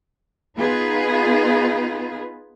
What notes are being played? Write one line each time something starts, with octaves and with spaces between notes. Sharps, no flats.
B3 D#4 F4 G#4 B4